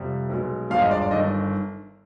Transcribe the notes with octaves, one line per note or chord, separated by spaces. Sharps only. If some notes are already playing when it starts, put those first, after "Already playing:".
Already playing: F2 C3 G3
B1 B2 G#3
G#1 G2 F3 G#3 F5
D#5
D5
D5
G1 G2 D#3 D#5